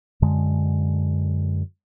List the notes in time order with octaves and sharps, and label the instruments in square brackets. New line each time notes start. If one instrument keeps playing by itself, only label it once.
[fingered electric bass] F#2 D3 G#3